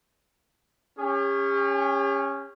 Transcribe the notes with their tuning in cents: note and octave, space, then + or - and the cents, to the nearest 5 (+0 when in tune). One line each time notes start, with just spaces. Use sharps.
C#4 +0 G4 +45